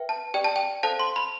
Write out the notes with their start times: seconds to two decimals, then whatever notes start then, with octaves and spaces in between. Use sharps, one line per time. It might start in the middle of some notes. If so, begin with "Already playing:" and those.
Already playing: B4 E5 G5
0.09 A5
0.34 G4 D5 G5
0.44 A5
0.56 G5
0.83 A4 C5 F5 A5
0.99 C6
1.16 B5